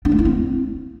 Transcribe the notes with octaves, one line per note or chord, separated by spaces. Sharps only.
D4
A3
E4
C4